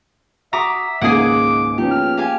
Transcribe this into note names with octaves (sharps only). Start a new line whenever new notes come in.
F#4 E5 A#5 D6 D#6
C#2 G#2 D#3 A#3 G#4 F#5 D6 D#6
F3 B3 C#4 D#4 G4
F6
G4 F5 G#5